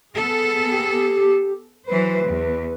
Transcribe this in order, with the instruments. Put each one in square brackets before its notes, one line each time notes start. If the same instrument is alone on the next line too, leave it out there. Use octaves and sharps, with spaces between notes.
[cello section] B3 G#4 A4
[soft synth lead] G4
[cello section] E3 F#3 C5 [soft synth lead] B4
[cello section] E2